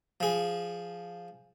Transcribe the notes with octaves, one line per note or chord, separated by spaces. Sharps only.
F3 G#4